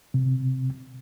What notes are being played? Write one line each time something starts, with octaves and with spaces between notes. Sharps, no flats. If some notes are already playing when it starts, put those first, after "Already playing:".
C3